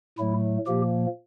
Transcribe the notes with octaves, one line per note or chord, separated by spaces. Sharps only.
A2 F#3 A3 E4
A#2 F3 A#3 G4